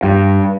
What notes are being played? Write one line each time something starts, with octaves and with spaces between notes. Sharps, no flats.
G2